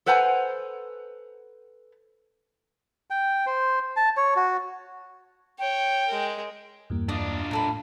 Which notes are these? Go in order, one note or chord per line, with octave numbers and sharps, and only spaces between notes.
A4 B4 C5 F#5 G#5 A#5
G5
C5
A5
C#5
F#4
C#5 G5
G#3 A#4
E2 G2 A#3
D4 F4 D5 D#5 D#6
A2 D#4 A4 B5
A2